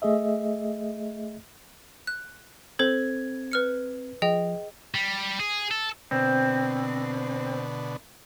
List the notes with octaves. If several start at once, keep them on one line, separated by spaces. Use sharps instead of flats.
A3 G#4 D#5 E5
F#6
C4 A4 C5 G#6
B4 F6 C#7
F3 G#4 D#5 G5
G3
G#4
A4
B2 D3 C4